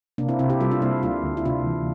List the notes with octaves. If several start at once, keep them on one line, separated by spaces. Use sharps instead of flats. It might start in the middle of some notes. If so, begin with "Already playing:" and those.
C3 A#3 D4
C4 E4
C3 C4 E4
E4 G4
G3 F4 A4
D4 F4
A#3 C4 E4
D2 D4 F4
D2
E4
C3 D4 F4
E3